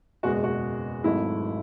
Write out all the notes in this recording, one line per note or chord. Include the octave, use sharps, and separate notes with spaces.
F#1 E2 B2 G#3 F#4
F#4
G#1 G#2 F#3 A3 E4